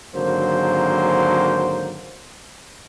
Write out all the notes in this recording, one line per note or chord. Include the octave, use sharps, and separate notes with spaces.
G#1 D3 F#3 A#3 C5